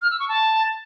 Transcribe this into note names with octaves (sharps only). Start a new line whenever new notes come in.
F6
E6
C#6
A5